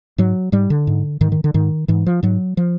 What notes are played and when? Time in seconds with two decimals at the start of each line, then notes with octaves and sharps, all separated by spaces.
0.18 G#2 F#3
0.52 G#2 G3
0.70 D3
0.87 G#2
1.21 G#2 D#3
1.32 D#3
1.44 D3
1.54 G#2 D#3
1.88 G#2 E3
2.06 F3
2.23 G#2 F#3
2.57 F3